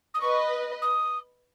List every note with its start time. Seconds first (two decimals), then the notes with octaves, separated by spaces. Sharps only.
0.14 D#6
0.21 B4 D#5 C#6
0.82 D#6